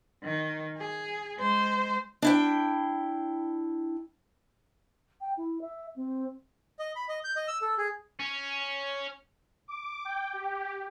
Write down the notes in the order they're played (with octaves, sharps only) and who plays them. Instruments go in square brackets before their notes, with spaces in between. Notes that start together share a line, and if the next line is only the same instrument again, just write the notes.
[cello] D#3
G#4
G#3 C5
[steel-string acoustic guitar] D4 E4 G5
[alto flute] G5
E4
E5
C4
[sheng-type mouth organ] D#5
B5
D#5
G6
D#5
E6
A4
G#4
[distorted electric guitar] C#4
[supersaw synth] D6
G5
G4